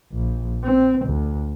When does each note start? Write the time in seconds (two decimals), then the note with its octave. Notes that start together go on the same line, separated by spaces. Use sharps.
0.12 A#1
0.64 C4
1.06 D2